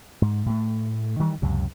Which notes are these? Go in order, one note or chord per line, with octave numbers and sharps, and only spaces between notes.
G#2
A2 A3
D#3 E3 G3
C#2 F#2 C3